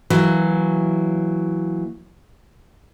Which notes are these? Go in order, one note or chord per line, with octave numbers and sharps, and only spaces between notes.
E3 F#3 A#3